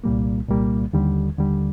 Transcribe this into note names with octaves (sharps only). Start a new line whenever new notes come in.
C2 A#2 G3 A#3
C2 A#2 G3 A#3
D#2 D3 G3
D#2 D3 G3